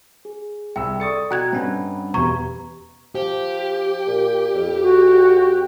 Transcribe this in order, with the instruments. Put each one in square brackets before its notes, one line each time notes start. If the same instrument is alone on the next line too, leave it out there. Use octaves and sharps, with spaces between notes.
[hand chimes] G#4
[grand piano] C2 E6 [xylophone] G5
[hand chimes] A4 D5 C#6 [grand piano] D#6 A6 C#7
[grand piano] B2 [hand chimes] D#5 F#5 A#5 [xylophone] G5 F#6 G#6
[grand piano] G2 [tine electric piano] C4 C#4 B4
[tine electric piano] E2 B2 [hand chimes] G4 B4 G#6 [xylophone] A#5 C#6
[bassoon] F3 [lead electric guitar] G4
[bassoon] A#2
F2
[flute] F#4